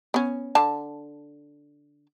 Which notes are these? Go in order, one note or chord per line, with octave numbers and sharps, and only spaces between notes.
B3 C#4
D3 A5